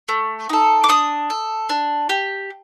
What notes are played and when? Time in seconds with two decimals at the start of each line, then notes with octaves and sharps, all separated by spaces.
0.09 A3
0.49 D#4 A4
0.84 D6
0.89 D4 D#6
1.30 A4
1.69 D4
2.09 G4